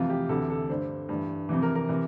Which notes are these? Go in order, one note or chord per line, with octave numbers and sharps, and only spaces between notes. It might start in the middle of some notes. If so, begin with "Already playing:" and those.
Already playing: F2 C3 E3 F4
G4
D2 C3 E3 A4
A4
G2 D3 C5
G2 E3
F2 C3 E3
A#4
A#4
C3 E3